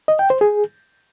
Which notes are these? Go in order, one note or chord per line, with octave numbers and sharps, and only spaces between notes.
D#5
G5
C5
G#4